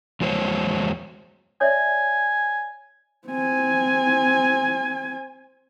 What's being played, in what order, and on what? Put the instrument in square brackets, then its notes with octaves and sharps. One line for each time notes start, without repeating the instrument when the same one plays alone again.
[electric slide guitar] E2 F#3 G#3 C5 C#5
[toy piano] C#5 D5 E5 [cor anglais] G#5
[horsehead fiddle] C4 G#5